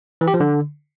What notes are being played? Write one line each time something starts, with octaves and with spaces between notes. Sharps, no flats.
E3
G4
F3
D3